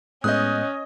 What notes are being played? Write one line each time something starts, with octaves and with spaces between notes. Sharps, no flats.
A2 G#3 B3 C#4 D#5 D#6 F#6 G6